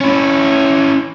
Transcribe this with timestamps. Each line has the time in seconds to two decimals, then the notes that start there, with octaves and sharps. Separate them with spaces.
0.01 C#4 E4